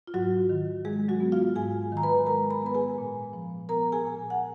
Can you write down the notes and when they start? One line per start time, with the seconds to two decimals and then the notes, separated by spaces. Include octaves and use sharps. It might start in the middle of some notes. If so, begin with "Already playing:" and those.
0.07 F4
0.14 G#2 F#3 F#4
0.49 D#3
0.85 G#3 G#4
1.08 F#3 F#4
1.20 B3
1.32 F4 F5
1.56 G#2 G#4 G#5
1.92 D#3 A#5
2.03 B4 B5
2.16 G#5
2.26 G#3 A#4 A#5
2.50 B5
2.62 B3 B4 B5
2.74 G#4 G#5
2.98 A#2
3.33 F3
3.69 B3 A#4 A#5
3.92 G#4 G#5
4.05 A#2
4.30 F#5